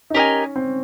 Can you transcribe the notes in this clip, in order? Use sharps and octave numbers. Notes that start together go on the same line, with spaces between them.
D#4
C#4 G4 A#4 D#5 G#5
C4